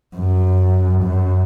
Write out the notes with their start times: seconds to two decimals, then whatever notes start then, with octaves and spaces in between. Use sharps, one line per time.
0.17 F#2
1.03 F#2